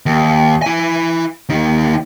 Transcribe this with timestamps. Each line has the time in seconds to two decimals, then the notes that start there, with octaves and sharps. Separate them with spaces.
0.06 D#2
0.62 E4 G#5
1.49 D#2 D#4